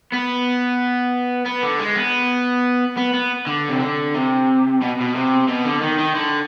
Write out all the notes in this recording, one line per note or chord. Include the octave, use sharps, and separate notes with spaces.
B3
B3
D3
G#3
B3
B3
B3
D3
C3
D3
C3
B2
B2
C3
B2
D3
D#3
D#3
D3